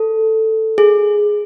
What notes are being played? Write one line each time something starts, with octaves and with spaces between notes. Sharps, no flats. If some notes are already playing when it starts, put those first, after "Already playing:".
Already playing: A4
G#4